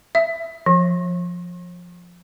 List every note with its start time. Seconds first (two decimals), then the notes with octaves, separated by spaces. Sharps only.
0.15 E5
0.66 F3